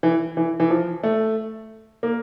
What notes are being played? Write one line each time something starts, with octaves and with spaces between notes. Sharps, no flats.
E3
E3
E3
F3
A3
A#3